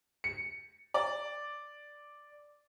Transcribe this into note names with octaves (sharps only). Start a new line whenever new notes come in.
C#7
D5